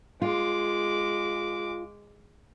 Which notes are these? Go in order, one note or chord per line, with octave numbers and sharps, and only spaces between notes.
G#3 F4 D6